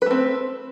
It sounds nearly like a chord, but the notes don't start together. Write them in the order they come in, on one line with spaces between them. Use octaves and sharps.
B4 A3 C4